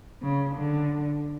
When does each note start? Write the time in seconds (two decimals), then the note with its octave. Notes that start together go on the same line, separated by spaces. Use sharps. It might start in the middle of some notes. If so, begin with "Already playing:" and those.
0.22 C#3
0.55 D3